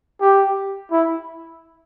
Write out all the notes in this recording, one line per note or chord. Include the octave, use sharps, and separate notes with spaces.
G4
E4